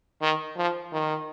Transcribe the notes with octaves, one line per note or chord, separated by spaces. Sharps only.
D#3
F3
D#3